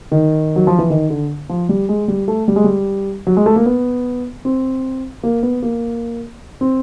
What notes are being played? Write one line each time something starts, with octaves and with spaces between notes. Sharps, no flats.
D#3
F#3
F3
E3
D#3
D3
F3
G3
G#3
G3
A3
G3
G#3
G3
F#3
G#3
A3
A#3
B3
C4
A#3
B3
A#3
C4